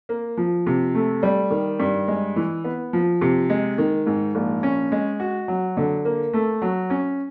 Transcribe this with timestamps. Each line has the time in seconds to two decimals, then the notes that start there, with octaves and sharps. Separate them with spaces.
0.09 A#3
0.37 F3
0.66 C3
0.95 A3
1.23 G3
1.51 D#3
1.80 G2
2.08 G#3
2.36 E3
2.64 B3
2.93 F3
3.21 C3
3.50 G#3
3.78 D#3
4.07 G#2
4.35 A#1
4.63 C#4
4.92 G#3
5.20 F#4
5.48 F#3
5.77 D3
6.05 A#3
6.33 A3
6.62 F#3
6.90 C#4